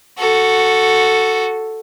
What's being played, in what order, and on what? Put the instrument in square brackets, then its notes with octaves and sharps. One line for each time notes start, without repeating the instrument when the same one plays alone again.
[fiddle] F#4 A4